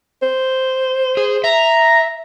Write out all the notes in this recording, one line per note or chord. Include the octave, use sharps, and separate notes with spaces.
C5
G#4
E5 A#5